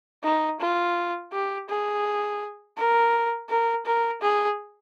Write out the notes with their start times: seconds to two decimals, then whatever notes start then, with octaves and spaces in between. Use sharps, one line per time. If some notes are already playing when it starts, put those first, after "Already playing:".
0.24 D#4
0.60 F4
1.32 G4
1.68 G#4
2.77 A#4
3.49 A#4
3.85 A#4
4.22 G#4